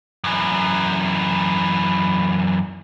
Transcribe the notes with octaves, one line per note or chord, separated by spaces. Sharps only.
F#2 E3